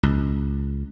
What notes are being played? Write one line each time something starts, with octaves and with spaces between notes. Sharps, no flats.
C#2